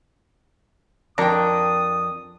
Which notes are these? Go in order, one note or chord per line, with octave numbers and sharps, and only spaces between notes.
F2 D4 A#4 G5 D#6